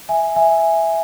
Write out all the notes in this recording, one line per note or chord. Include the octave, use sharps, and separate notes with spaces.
E5 G#5
E5 G#5